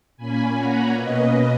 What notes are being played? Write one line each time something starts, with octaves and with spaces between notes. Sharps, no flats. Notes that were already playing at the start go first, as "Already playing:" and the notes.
A#2 A#3 C#4 G#5 B5
F#5 A#5
B2 A#3 C#4 B4 D#5